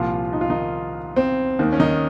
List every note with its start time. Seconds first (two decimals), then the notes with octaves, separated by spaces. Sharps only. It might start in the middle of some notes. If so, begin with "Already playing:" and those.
Already playing: C2 A#2 F3 F4
0.33 D#4
0.41 F4
0.50 D#3 D#4
1.16 C4
1.59 D#2 D#3
1.72 C#4
1.80 D#3 D#4